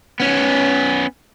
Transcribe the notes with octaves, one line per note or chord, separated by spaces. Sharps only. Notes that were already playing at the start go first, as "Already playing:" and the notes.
B3 C#4